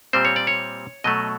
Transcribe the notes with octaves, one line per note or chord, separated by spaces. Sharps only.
A#2 G3 C4 C5
C#5
D5
C#5
B2 F#3 A3 D#5